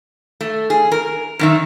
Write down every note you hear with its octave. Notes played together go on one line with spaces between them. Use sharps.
A3
G#4
A#4
F#2 D#3 E5